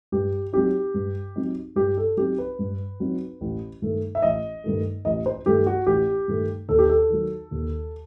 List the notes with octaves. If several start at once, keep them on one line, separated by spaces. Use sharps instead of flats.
G2 G4
F#3 C4 D#4 G4
G2
F#3 C4 D#4
G2 G4
A4
F#3 C4 D#4 G4
B4
G2
F#3 C4 D#4
A1
G2 D#3 A3
E5
A1 D#5
G2 D#3 A3
A1 D#5
C5
G2 D#3 A3 G4
F#4
A1 G4
G2 D#3 A3
D#2 A4
G4
A4
D#3 F#3
D#2